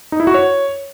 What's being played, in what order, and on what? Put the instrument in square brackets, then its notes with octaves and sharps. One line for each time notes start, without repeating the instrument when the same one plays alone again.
[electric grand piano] D#4
E4
F#4
C#5